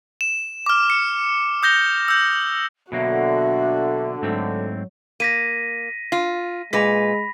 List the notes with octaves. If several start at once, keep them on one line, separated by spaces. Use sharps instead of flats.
E7
D6 F6
C#7
D#6 G6 A#6 G7
E6 G6
B2 D3 F#3 A#3 F#4 E5
G#2 F#3 A3 C4
A#3 A#6 B6 D#7
F4
A#2 G#3 B4 B5 A#6 B6